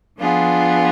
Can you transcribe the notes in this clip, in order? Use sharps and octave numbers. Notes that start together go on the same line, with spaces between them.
F3 B3 D4 F4 G#4